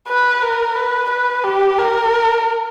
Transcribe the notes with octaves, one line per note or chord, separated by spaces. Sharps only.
B4
A#4
B4
B4
G4
A#4